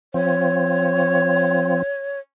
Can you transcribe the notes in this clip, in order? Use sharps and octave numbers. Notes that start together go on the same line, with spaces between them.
F3 C4 C#5